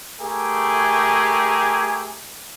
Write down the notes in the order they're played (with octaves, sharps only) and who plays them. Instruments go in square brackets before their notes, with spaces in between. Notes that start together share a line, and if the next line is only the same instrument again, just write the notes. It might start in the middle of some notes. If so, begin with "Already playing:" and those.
[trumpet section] A3 G4 G#4 A#4 G#5